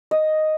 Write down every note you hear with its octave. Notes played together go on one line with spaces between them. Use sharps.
D#5